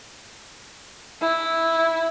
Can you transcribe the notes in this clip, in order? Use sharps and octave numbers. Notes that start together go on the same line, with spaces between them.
E4